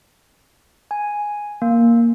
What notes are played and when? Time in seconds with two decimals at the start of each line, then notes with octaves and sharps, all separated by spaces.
0.91 G#5
1.62 A#3